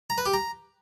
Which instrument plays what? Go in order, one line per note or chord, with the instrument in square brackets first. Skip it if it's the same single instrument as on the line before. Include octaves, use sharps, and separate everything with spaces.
[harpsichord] A#5
B4
G4
A#5